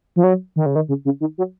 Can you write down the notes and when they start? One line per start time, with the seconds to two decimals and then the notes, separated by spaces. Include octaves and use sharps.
0.16 F3
0.24 F#3
0.56 D#3
0.66 C#3
0.75 D#3
0.89 C#3
1.05 C#3
1.20 D#3
1.38 F#3